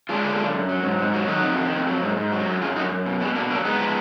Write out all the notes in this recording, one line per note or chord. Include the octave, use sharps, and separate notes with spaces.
G#3 D4 F4
D3
F#2
F#2
F#3
G#2
G#2
F#3
D#3 D#4 F#4
F2
D#3
F2
F#3
G#2
G#2
F#3
F#2
F#2 F4 G#4
F#2 D#4 F#4
F#2
B2
B2 G#3 B3
B2 A#3 D4
F#3 A#3 D4
G#3 B3 D#4
F3